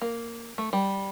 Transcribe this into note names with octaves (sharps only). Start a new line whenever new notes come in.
A#3
A3
G3